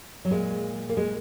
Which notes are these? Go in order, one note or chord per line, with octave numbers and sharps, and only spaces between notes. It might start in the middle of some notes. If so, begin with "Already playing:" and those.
F#3
A#2 G#3
A#3
G#3